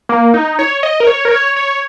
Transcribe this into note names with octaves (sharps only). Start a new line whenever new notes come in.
A#3
D#4
C#5
D#5
A#4
C#5
A#4
C#5
C#5